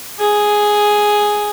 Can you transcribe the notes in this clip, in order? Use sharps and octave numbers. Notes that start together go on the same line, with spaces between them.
G#4